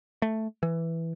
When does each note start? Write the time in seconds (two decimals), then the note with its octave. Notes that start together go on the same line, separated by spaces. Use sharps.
0.22 A3
0.63 E3